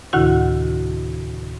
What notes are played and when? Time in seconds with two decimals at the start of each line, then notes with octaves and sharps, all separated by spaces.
0.13 D2 A2 C3 D#3 E4 F#4